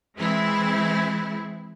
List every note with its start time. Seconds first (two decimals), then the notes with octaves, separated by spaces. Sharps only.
0.17 E3 G#3 C4 E4